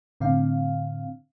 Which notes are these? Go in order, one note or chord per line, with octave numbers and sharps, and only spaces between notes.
A2 D3 C4 F5